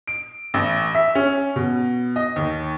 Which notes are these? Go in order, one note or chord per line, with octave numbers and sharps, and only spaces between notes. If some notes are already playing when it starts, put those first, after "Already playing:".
D7
A1
E5
C#4
B2
D#5
D#2